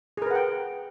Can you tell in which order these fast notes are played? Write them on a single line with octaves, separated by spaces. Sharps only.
G#4 A#4 B4 F#5 G5